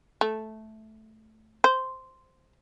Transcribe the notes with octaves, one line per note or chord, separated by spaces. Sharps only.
A3
C5